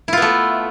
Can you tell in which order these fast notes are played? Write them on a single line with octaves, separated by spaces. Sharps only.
E4 F4 B3 A3